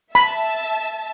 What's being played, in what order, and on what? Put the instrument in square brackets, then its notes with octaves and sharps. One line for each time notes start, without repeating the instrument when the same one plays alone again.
[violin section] E5 A5 [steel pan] B5